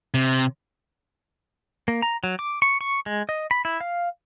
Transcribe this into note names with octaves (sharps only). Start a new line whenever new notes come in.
C3
A#3
A#5
F#3
D6
C#6
C#6
G#3
D#5
B5
E4
F5